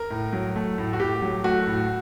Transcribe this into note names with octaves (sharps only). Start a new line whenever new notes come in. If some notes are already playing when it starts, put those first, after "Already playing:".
Already playing: A#4
A2
F#3
A3
A2
F#4
A2 G4
F#3
A3 F#4
A2